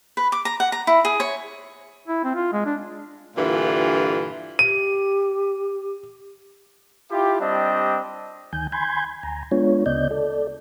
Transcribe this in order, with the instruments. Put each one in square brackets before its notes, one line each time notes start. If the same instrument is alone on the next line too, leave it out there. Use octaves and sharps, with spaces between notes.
[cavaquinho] B4
D6
A#5
F#5
A#5
E4
G#4
C#5
[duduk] E4
C4
F4
G#3
D4
[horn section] G2 A#2 D3 E3 F4
[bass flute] G4 [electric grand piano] D#7
[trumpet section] E4 F4 G4
G3 C4 D4 D#5
[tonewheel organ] D2 D#3 G#5 G6
G#5 B5 C6 G6 G#6
D2 G#5 A#5
G#3 B3 D4 F4 C#5
D2 C#3 B3 D5 D#5 G6
A4 D5